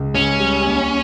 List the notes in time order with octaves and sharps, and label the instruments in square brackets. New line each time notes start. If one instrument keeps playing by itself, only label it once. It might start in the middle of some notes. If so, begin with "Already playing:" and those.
Already playing: [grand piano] C#2 C#3
[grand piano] C#2 [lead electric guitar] C#4
[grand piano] G3
D#2